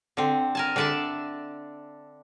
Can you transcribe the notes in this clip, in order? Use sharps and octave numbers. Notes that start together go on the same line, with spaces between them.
D3 C4
A#4 G#5 A5
D3 D4 D5 E5 A5